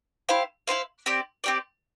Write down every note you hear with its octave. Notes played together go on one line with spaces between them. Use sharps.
E4 G4 C5 F5
E4 G4 C5 F5
C4 G4 D5
C4 G4 D5